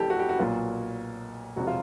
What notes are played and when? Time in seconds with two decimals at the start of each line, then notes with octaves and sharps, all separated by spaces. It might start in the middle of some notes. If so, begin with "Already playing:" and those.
Already playing: F1 F2 E3 G4 A4
0.10 F#4
0.19 G4
0.29 F#4
0.39 B1 A#2 F#3 B3 F4
1.56 E1 C3 F3 F#4
1.67 F4